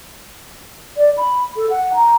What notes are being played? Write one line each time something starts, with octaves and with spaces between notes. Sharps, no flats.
D5
B5
A4
F#5
A#5